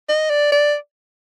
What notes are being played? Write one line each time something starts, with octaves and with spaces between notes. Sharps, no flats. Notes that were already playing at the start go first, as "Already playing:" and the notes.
D#5
D5
D5